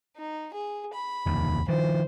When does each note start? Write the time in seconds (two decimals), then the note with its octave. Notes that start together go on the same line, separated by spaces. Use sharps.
0.16 D#4
0.54 G#4
0.93 B5
1.26 F1 D#2
1.68 D#3 F3 C5